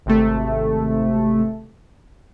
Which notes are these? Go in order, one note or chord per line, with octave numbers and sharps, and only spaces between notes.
G#1 C3 A3